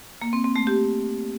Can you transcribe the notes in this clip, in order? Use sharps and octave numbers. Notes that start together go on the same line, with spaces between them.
A#3
C4
C4
A3
G4